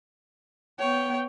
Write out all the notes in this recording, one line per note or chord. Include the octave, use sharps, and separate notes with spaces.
B3 C#5 G5